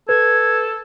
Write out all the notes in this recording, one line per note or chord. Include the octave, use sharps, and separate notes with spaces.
A4 B4 G#6